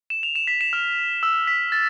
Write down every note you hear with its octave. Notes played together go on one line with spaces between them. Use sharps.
E7
F7
E7
B6
E7
F6
E6
B6
A6